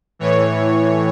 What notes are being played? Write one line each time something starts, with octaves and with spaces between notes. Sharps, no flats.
A2 E3 C#5